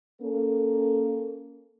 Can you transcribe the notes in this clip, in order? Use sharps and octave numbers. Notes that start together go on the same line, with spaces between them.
A#3 C#4 A4